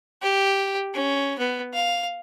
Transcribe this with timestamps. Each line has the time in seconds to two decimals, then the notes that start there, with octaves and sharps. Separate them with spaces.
0.22 G4
0.94 C#4
1.39 B3
1.74 F5